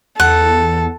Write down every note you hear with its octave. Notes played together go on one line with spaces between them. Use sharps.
E2 A4 F#5